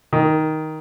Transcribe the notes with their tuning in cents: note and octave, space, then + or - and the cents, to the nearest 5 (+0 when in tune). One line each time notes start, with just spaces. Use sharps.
D#3 +10